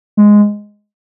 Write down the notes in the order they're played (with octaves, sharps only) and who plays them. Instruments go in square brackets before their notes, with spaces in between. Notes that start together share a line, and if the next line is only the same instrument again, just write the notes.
[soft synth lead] G#3